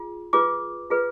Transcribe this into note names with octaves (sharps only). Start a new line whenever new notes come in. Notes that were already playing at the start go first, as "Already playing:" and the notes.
Already playing: F4 G#4
F4 G#4 B4 D6
F4 G#4 B4